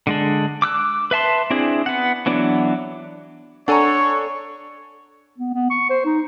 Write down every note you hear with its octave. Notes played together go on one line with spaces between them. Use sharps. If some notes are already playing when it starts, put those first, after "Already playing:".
D3 G#3 D4
D6 E6 F#6
B4 E5 A5 C6
C4 D4 E4 G#4
B3 F#5
E3 F#3 B3 D4
D4 A4 C#5 F#5 G#5 A#5 C#6
B3
B3
C#6
C5
D#4